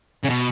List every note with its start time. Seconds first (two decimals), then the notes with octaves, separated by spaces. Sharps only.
0.24 C#3
0.30 B2